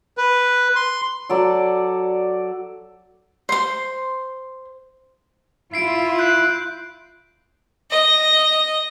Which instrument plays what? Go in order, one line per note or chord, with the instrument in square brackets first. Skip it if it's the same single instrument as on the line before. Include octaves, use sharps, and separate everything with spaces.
[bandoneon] B4
C6
[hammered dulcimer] F#3 A4 D5
[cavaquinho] C5 C6
[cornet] E4 [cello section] F4 [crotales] C7 D7
[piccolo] F#6 [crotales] G6
[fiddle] D#5